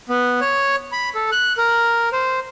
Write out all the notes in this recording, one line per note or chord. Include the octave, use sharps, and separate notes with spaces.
B3
C#5
B5
A4
F#6
A#4
C5